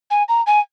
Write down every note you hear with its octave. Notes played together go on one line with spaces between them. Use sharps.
G#5
A#5
G#5